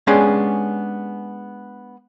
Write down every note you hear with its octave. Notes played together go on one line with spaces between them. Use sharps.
G#3 B3 C#4 D4 G4 G#4